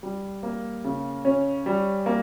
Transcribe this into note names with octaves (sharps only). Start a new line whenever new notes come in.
G3
A#3
C#3
C#4
G3
A#3